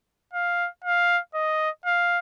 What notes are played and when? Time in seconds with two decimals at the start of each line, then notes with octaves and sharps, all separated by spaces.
0.33 F5
0.84 F5
1.34 D#5
1.86 F5